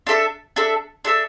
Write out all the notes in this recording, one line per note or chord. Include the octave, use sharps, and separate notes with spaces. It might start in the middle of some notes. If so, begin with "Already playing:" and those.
D4 A4 E5 A5
D4 A4 E5 A5
D4 A4 E5 A5